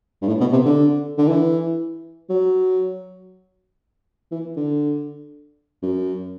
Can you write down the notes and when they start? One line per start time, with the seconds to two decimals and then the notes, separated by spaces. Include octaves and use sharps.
0.22 G2
0.28 A2
0.40 B2
0.52 C3
0.65 D3
1.18 D3
1.28 E3
2.30 F#3
4.31 E3
4.57 D3
5.83 F#2